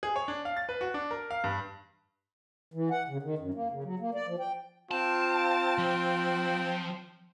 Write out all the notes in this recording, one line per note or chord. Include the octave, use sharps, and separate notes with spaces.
G#4
C#5
D4
F5
A6
B4
F#4
D4
A#4
F5
G2
E3
F#5
C#3
D#3
F#2
A#3
C#3
F#3
A#3
D5
F3
G5
C4 F4 A5
F3